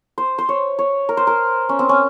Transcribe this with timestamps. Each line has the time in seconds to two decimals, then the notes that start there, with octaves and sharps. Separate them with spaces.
0.18 C5
0.38 C5
0.49 C#5
0.79 C#5
1.09 A#4
1.17 C5
1.27 A#4
1.69 C#4
1.79 C4
1.89 C#4